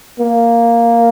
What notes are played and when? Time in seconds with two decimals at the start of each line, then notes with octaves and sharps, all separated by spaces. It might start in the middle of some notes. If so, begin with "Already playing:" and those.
0.20 A#3